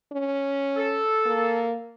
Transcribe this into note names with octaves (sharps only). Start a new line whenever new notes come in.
C#4
A4
A#3